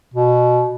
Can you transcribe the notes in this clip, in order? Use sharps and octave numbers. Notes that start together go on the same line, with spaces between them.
B2